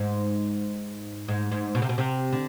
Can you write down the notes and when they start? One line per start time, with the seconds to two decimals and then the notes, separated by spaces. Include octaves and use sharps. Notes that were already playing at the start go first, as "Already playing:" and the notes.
Already playing: G#2
1.28 G#2
1.51 G#2
1.75 B2
1.82 C3
1.89 B2
1.98 C3
2.33 D3